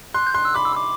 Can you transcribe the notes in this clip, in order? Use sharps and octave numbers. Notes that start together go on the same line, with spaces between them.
C6 F#6
G6
C6 F#6
E6
B5 D6
E6
D6